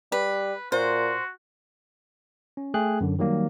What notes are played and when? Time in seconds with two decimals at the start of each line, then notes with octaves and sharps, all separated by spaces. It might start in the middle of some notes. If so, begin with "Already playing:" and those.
0.12 G3 B4
0.72 A#2 F#4 C5
2.57 C#4
2.74 A3 G#4 G5 F#6
3.01 F#2 D3
3.19 D#3 F#3 G3 A#3